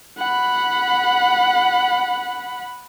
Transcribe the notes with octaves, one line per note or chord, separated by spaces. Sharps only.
F#5 B5